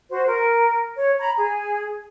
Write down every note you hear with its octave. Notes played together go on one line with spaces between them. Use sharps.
F#4 C5
A#4
C#5
A#5 B5
G#4